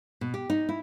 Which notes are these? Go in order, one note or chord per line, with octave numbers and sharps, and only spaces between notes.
B2
G4
D#4
E4